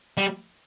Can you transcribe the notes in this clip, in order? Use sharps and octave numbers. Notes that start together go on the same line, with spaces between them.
G3